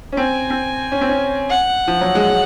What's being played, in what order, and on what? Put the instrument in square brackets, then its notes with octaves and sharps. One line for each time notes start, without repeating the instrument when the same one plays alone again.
[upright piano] C#4
[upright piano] C4 [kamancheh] G#5
[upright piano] C4
C#4
C4
C#4
[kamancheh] F#5
[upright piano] F3
F#3
G#3
G#3